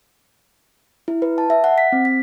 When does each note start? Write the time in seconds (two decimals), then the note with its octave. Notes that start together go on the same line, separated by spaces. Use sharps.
1.08 E4
1.22 B4
1.38 A5
1.50 E5
1.64 F#5
1.78 B6
1.92 C4
2.05 B6